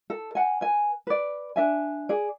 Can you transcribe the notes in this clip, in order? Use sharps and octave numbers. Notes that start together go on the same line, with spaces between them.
A4
F#5 G#5
B4 G#5
B4 D5
D4 E5 G#5
G#4 D5